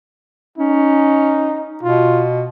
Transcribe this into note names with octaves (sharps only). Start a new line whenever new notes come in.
C#4 D#4
B2 F4